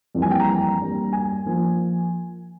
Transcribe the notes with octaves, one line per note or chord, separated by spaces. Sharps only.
F2 E3 G3 A#3
G#5
G5
A#5
G2 G3 A#3
G#5
F3 A#3